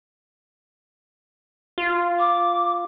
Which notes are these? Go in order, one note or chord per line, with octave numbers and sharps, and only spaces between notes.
F4
D6